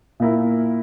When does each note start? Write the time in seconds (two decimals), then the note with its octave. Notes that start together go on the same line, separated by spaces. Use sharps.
0.20 A#2 A#3 E4 A#4